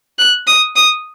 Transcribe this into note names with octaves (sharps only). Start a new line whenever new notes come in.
F#6
D#6
D#6